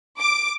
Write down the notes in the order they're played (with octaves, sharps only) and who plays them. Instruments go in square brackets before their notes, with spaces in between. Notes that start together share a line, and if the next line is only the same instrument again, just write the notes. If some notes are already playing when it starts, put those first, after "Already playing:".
[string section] D6